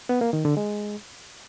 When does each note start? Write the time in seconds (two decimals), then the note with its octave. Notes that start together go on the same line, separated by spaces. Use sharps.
0.09 B3
0.21 A#3
0.33 D#3
0.45 D3
0.57 G#3